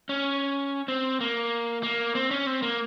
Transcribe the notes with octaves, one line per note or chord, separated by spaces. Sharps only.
C#4
C4
A#3
A#3
C4
C#4
C4
A#3